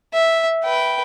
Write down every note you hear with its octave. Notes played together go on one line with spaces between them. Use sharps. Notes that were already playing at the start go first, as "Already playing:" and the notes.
E5
B4 G5